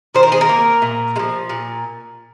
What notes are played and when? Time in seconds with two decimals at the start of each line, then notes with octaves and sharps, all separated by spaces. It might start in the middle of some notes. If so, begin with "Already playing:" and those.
0.15 D#3 C5
0.23 A#4
0.32 G#4
0.41 A#4
0.49 A#3
0.82 A#2
1.16 G#3
1.19 F3
1.49 A#2